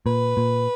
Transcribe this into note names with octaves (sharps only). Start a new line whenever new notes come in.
A#2 B4
A#2